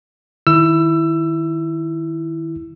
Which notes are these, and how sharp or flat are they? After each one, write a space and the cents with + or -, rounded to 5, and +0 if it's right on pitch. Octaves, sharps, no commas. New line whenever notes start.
D#3 +5 E4 +0 E6 +20